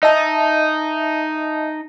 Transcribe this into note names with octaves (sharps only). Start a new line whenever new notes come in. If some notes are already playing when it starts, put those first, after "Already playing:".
D#4 D#5 E5 A5